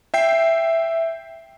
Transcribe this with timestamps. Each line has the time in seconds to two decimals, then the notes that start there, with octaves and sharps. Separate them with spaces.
0.14 E5 G5 C7